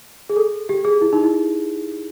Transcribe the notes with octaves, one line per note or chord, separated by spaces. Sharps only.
G#4
A4
G4
G#4
E4
D#4
E4